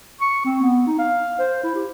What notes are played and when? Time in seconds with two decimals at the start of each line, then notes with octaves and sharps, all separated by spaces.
0.21 C#6
0.45 C4
0.62 B3
0.87 D#4
0.98 F5
1.39 C5
1.63 E4
1.75 G4